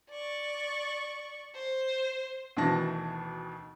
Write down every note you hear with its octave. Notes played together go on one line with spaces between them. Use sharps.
D5 C#6
C5
D2 B2 D#3 E3 A5 A#6